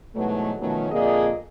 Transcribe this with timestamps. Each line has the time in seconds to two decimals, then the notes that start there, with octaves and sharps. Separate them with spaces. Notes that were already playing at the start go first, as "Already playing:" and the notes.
0.15 G#2 B2 E3 F#3 A3
0.59 B2 D#3 F3 F#3 A3 C#4
0.91 F2 A#2 D3 A#3 G#4 D#5